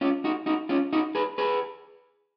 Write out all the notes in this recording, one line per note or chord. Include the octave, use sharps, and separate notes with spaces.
C#4 F4
D#4 F#4
D#4 F#4
C#4 F4
D#4 F#4
G#4 B4
G#4 B4